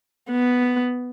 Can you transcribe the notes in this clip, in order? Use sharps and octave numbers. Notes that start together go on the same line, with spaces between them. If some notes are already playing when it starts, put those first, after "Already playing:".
B3